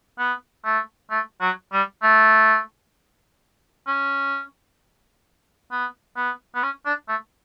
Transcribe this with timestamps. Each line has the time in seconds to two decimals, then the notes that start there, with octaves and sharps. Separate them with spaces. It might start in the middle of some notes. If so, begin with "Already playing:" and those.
0.19 B3
0.65 A3
1.10 A3
1.41 F#3
1.72 G3
2.03 A3
3.87 C#4
5.71 B3
6.16 B3
6.55 B3
6.63 C#4
6.86 D4
7.08 A3